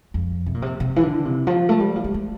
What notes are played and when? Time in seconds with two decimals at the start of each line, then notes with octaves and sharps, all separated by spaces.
0.14 F2
0.46 C3
0.54 A#2
0.62 C3
0.80 C3
0.96 E3
1.03 D3
1.25 C3
1.47 F3
1.69 A3
1.80 G3
1.96 F3
2.04 G3
2.14 A3